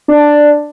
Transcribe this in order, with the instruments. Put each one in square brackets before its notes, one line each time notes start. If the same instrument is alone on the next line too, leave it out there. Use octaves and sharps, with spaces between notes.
[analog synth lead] D4